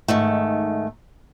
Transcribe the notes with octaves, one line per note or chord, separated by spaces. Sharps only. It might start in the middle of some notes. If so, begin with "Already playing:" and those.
G#2 D#3 A3